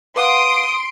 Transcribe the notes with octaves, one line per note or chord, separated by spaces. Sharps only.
B4 F5 F#5 C6 D#6 D7